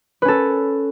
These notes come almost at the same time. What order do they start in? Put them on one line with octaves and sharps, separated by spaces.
B4 C#4 A4